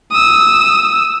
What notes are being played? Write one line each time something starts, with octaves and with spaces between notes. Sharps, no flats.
D#6 E6